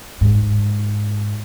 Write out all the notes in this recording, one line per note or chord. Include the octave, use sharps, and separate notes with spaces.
G#2